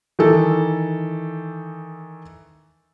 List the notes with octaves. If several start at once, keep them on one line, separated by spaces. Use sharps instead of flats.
D#3 E3 A4